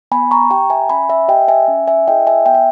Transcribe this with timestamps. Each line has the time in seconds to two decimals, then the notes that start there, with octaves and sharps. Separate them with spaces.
0.12 B3 G#5 B5
0.31 A#5 C#6
0.50 G4 G5 A#5
0.70 E5 G#5
0.90 C#4 G#5 B5
1.09 E5 G#5
1.28 G4 D#5 G5
1.48 E5 G#5
1.68 C#4
1.87 E5 G#5
2.07 E4 G#4 D#5 G5
2.27 E5 G#5
2.46 B3 G5
2.54 E5